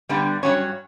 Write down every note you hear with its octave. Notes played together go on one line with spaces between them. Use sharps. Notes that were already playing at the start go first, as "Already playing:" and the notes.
G2 D3 G3 B3
G2 F#3 C#4 C#5